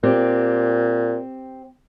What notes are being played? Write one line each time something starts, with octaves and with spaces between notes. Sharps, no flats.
A#2 C4 G4